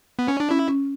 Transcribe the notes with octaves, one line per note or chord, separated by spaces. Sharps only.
B3
C#4
D4
C#4 E4
C#4